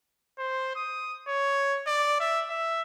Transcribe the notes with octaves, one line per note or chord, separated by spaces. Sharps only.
C5
D#6
C#5
D5
E5
E5